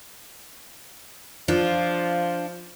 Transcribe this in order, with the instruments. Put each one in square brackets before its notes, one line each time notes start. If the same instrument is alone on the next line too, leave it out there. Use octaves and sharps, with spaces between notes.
[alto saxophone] F3 [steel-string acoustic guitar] D4 F4